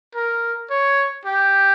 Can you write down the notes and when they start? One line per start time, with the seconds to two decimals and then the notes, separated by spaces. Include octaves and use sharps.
0.15 A#4
0.70 C#5
1.25 G4